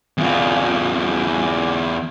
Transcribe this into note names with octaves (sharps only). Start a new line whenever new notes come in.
E2 F4